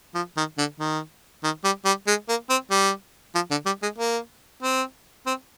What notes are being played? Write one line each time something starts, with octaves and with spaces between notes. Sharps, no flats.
F3
D#3
D3
D#3
D#3
G3
G3
G#3
A#3
C4
G3
F3
D3
G3
G#3
A#3
C4
C4